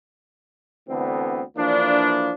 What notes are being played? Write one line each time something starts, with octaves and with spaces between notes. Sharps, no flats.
D2 D3 E3 B3 C4
E3 F3 A#3 D4